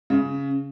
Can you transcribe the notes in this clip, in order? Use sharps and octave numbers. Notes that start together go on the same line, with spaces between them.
C#3